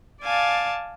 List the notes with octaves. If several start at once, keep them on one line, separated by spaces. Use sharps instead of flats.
D5 F5 G#5 A5